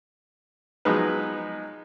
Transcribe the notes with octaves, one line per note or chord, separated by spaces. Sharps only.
F3 F#3 G#3 B3 D#4 B4